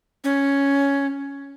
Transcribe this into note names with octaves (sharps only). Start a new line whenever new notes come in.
C#4